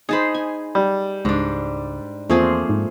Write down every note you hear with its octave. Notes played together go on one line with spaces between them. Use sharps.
D#4 G#4 C5 A5 B5
G#5
G3
C#2 G#2 D4
E2 F3 A3 A#3 C4 G#4
G#2